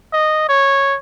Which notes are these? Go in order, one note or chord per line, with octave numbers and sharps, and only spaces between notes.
D#5
C#5